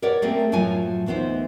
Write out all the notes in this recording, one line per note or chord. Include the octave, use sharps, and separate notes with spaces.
A#4 B4 C#5 D5 F#5
A3 A#3 C4 C#4 G#4
F#2 A2 F3 F#3 F4 G#5
D2 E3 B3 D#4 C5